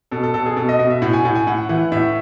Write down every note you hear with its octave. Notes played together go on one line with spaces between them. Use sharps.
B2 A4
A4
B2 A4
G#4
B2 A4
D#5
B2 D#5
E5
A2 F#5
G#5
A2 F#5
G#5
A2 F#5
E3 F#5
A2 E5